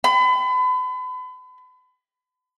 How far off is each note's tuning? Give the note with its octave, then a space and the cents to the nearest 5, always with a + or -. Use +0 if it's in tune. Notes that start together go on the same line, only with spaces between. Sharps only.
B5 +35